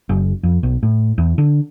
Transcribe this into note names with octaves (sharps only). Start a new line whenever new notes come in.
F#1
F2
B1
A2
E2
D3